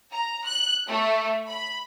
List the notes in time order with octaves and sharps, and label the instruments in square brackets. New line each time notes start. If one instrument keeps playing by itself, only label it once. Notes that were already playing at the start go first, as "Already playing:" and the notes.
[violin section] A#5
F#6
A3
B5